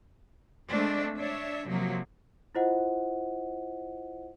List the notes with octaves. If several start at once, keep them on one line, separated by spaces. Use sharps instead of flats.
G#3 A3 C4 D4
D4 C#5 E5
C3 F3 F#3 A#3
E4 F4 C5 D#5 F#5